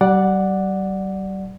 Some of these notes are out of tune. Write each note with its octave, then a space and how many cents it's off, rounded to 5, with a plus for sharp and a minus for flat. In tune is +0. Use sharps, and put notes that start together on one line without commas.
G3 -40 D5 +0 F#5 +0